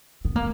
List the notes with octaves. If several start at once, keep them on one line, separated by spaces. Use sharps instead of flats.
B3
A#3